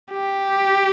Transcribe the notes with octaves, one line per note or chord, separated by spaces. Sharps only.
G4